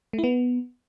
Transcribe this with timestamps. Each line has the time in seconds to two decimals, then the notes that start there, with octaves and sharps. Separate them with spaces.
0.13 A3
0.18 E4
0.24 B3